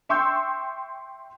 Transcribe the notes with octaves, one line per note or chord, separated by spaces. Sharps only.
E5 G5 C6 C#6 E6 G6